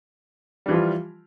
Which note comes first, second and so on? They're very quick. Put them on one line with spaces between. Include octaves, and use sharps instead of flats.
G3 E3 F3 F4